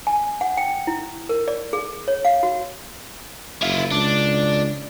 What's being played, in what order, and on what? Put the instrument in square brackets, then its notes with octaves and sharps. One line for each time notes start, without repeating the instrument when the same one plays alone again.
[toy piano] G#5
F#5
G5
E4
A#4
D5
G#4
C#5
F5
F#4
[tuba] F#1 [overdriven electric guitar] E4 F4
[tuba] C#2 [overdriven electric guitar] D4